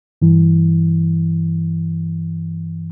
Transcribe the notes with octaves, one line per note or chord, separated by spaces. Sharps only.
G2 E3